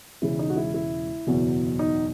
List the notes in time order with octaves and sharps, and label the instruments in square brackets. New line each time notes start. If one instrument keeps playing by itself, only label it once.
[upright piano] E1 E2 C#3 G#3 E4
D#4
F#4
E4
E4
F#1 E2 B2 F#3
D#4